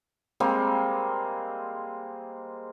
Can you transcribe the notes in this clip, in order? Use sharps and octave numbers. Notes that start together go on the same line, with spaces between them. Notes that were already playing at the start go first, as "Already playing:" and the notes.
G3 G#3 A#3 C4